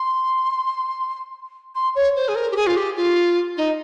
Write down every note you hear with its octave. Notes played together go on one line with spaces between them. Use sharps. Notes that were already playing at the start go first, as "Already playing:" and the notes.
Already playing: C6
C6
C#5
C5
G#4
A#4
G4
G#4
F4
G4
F4
D#4